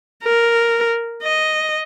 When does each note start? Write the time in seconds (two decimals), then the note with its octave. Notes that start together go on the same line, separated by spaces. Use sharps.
0.24 A#4
1.23 D#5